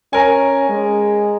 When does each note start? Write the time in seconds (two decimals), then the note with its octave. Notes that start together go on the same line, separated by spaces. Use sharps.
0.13 C#4 A#4 G#5
0.69 G#3